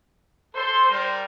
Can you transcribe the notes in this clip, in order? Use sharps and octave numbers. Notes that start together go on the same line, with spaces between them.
A4 C5 C6
G3 A#4